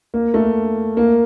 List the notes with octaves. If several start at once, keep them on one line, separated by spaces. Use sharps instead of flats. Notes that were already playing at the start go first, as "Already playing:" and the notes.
A#3
A3
A#3